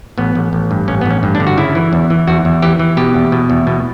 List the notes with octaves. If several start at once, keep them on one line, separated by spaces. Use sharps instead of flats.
A1 B3
A1
A1
G2
A1 C#4
A1 B3
C#4
G2
D4
D3
F#4
C#3 E4
E3
E2
E3
E2 F#4
E2
E3 G4
E3
B2 G4
E2
B2
E2
B2